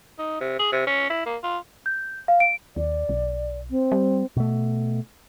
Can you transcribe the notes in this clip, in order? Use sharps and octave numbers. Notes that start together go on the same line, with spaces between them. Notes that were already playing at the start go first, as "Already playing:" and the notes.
D#4
C3
G#4
C3
C#4
E4
A#3
F4
G6
F5
D7
D#2 D5
B1
C4
G3
B2 A3